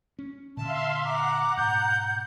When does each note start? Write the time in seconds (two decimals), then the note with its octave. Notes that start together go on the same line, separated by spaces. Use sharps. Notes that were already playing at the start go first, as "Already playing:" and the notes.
0.19 C#4
0.57 A#2 D3 E5 F5 A5 C6
1.05 F#5 A#5 D6
1.57 G#2 B2 G6